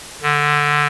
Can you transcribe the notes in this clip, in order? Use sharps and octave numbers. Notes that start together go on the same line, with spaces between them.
D3